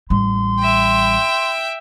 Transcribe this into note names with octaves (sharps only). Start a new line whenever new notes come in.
A1 G3 C6
E5 G5